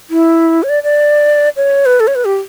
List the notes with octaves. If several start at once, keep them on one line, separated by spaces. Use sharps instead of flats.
E4
C#5
D5
D5
C#5
B4
A4
C#5
B4
G4